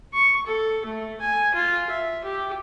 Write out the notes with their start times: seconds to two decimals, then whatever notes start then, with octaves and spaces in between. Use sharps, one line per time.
0.14 C#6
0.46 A4
0.85 A3
1.21 G#5
1.54 F4
1.90 E5
2.24 G4